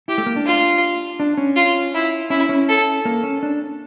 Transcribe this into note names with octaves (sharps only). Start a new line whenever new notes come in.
E4 G4
A3
A#3
D4
F4
D4
C#4
F4
E4
C#4 E4
C#4
A4
A#3
C#4
D4